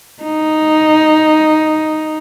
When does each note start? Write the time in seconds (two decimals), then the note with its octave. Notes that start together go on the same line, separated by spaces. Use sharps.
0.23 D#4